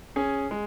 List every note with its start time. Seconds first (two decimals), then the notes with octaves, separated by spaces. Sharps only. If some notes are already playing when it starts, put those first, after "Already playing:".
0.16 C#4 G#4
0.51 G#3